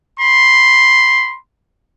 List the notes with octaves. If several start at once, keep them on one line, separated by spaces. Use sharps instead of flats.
B5 C6